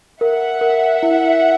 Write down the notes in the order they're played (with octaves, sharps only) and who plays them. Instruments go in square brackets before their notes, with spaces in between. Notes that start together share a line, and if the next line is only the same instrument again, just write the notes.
[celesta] A#4 [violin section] E5 F#5
[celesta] A#4
E4